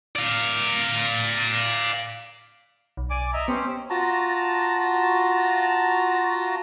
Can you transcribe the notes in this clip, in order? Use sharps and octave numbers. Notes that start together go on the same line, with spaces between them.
D5 F5
B1
D5 G#5 D6
D#5 E5 A#5
B3 C#4 G4 C5
F4 F#4 A5 A#5